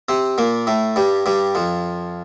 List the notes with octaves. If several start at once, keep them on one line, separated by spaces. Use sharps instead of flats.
C3 C4
A#2 A#3
A2 A3
G2 G3
G2 G3
F2 F3